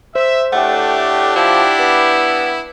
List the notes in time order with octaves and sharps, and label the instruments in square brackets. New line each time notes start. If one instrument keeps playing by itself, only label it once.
[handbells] C5 [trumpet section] E5
[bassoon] A2 [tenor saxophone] A3 [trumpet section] D4 G4 [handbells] F#5 G5
[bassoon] F3 [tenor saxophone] E4
[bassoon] B3